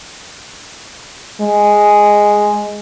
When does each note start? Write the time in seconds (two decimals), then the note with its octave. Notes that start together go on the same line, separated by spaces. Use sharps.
1.41 G#3